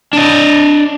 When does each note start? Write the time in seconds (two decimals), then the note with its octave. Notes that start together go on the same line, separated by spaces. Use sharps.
0.13 D4 D#5